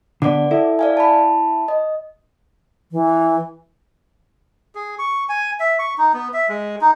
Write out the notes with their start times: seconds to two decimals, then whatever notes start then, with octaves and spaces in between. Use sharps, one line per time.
0.22 D3 B3 D5 F#5 D6
0.51 E4 A4
0.79 D5 F5 G#5
0.97 A5 B5
1.68 D#5
2.92 E3
4.75 G#4
4.99 C#6
5.29 G#5
5.60 E5
5.79 C#6
5.98 D#4
6.14 B3
6.34 E5
6.49 G#3
6.81 D#4